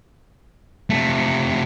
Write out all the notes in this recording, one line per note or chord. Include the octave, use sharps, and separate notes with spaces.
C3 A3